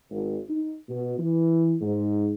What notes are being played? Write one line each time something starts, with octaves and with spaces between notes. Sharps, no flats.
G#1
D#4
B2
E3
G#2